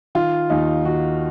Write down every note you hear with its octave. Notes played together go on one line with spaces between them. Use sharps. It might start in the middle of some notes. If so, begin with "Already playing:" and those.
D#3 F4
D#2 D#4
D#3 F#4